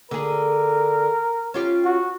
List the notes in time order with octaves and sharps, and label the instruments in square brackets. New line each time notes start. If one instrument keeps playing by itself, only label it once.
[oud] D3 G#4 [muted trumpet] A#4
[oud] C#4 F4 G4
[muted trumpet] F#4